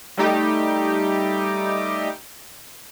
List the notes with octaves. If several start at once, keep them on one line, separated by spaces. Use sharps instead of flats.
G3 A3 D#4 G4